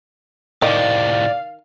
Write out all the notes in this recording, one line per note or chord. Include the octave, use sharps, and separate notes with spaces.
A2 C3 D#3 D5 F5